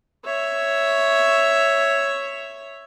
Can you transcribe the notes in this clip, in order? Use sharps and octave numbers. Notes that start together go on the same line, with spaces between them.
C#5 E5